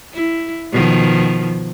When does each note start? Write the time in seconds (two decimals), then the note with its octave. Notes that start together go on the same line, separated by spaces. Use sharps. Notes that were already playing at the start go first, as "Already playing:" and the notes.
0.14 E4
0.72 B2 D#3 F3